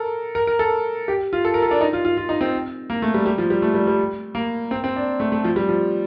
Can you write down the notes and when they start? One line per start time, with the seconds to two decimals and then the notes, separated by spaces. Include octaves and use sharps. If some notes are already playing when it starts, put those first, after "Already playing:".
Already playing: A4 A#4
0.35 A#4
0.47 A#4
0.59 A4
1.08 G4
1.33 F4
1.45 A4
1.54 A#4
1.62 A4
1.71 D4
1.81 D#4
1.93 F4
2.05 F4
2.17 F4
2.29 D#4
2.41 C4
2.90 A#3
3.02 A3
3.14 G3
3.26 G3
3.38 F3
3.50 G3
3.62 A3
3.74 G3
3.87 G3
4.35 A#3
4.71 C4
4.84 C4
4.96 D4
5.20 A3
5.32 A3
5.44 F3
5.56 G3
5.69 F3